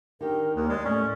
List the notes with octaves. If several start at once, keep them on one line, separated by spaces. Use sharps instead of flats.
D#3 D4 G4 A#4
D#2 A#3
G#3 D5
A2 C#4